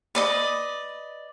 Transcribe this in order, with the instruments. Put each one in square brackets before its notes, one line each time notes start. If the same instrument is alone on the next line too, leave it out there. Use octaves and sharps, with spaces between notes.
[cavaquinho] B4 D5 D#5